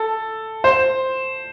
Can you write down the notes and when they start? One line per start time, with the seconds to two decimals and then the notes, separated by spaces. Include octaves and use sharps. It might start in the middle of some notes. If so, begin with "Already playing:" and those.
Already playing: A4
0.64 C5